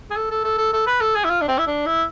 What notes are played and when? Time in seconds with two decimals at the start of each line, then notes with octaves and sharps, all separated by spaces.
0.11 G#4
0.16 A4
0.30 A4
0.44 A4
0.58 A4
0.73 A4
0.87 B4
1.01 A4
1.15 G#4
1.24 E4
1.30 F4
1.41 D4
1.48 C4
1.58 E4
1.67 D4
1.86 E4